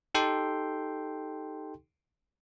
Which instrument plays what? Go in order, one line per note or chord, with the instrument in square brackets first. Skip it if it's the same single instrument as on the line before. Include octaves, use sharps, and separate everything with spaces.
[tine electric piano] D#4 G4 A4 G5 C6